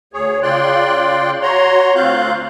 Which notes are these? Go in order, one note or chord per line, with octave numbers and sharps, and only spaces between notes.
D2 G#4 C#5
C#3 F4 D5 G5 C6 F#6
F#4 C#5 A#5 C6
D2 C4 F4 F5 F#6 G6